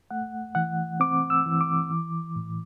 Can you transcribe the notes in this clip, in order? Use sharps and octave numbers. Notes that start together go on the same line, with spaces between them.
A3 F#5
E3 F#5
C4 D6
E6
E3
D6
E3
A2